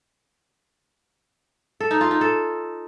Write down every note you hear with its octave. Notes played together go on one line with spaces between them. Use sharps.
A4
D#4
F4
D#4
A4